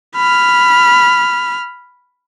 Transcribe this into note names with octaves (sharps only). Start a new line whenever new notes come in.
B5 F6